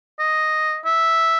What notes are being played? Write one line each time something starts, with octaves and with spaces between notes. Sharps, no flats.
D#5
E5